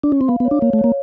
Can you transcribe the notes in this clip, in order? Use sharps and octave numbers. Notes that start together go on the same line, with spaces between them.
D4
C#4
C4
B3 F5
B3
C#5
D4
A#3 C#5
A3
C#5
A#3